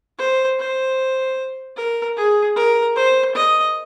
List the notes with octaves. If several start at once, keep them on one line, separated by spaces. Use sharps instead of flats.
C5
C5
A#4
G#4
A#4
C5
D#5